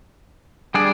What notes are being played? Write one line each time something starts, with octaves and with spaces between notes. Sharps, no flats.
G3 D4 G#4 D5